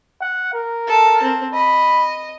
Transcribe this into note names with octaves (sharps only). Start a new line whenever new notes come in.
F#5
A#4
A4 A5
C4
D#5 B5